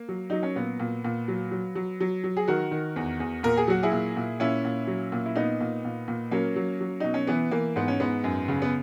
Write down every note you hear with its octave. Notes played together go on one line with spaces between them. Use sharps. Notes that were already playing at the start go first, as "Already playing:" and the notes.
Already playing: A#3
F#3
F#3 D#4
C#4
A#2 B3
A#2
A#2
F#3
F#3
F#3
F#3
F#3
G#4
D#3 F#4 A#4
D#3
E2
E2
A#2 A#4
G#4
F#3 F#4
E4 G#4
A#2
A#2
A#2 C#4 E4
A#2
F#3
A#2
E4
A#2 B3 D#4
A#2
A#2
A#2
F#3 A#3 C#4
F#3
F#3
B2 D#4
C#4
E3 B3
E3 A#3
G#2 B3
C#4
G#2 B3
F#2
C#3
B3